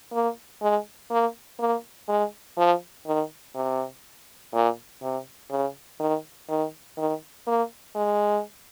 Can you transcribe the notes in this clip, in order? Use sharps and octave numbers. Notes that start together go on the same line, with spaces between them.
A#3
G#3
A#3
A#3
G#3
F3
D#3
C3
A#2
C3
C#3
D#3
D#3
D#3
A#3
G#3